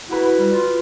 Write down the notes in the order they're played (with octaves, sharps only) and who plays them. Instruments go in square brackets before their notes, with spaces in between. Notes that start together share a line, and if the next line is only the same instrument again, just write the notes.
[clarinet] E4 [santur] F#4 B4
[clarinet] G3
F4